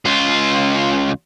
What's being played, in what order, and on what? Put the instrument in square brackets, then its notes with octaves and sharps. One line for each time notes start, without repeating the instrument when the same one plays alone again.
[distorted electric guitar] C#2 F4